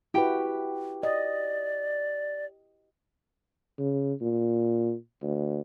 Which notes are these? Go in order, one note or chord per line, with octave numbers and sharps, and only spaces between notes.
E4 F#4 G4 B4 G5
D5 D#5
C#3
A#2
D2